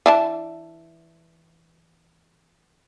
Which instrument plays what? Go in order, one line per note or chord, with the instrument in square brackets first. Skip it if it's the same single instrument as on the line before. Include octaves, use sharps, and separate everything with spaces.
[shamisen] E3 D4 A5